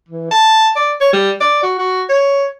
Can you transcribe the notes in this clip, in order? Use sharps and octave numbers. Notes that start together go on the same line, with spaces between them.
E3
A5
D5
C#5
G3
D5
F#4
F#4
C#5